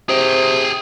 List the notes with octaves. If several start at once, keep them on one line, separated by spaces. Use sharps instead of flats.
C3 G#4 G5